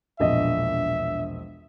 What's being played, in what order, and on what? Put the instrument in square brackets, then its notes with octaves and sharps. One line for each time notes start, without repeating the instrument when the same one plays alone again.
[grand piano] E1 A#1 D#5 [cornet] E5